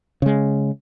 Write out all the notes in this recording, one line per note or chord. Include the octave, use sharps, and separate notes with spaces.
C#3 G#3